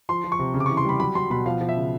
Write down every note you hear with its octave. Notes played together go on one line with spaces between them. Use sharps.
F3 C6
F3
C#6
C3
C#3
D6
E3 C#6
C6
G3 B5
F#3 B5
F#3 C6
B2 B5
F3 F5
F3
E5
C#3